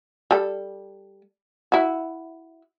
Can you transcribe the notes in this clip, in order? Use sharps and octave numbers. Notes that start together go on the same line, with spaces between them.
G3 A4
E4 F#4